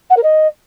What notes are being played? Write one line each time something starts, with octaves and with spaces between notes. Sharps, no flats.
F#5
A#4
D#5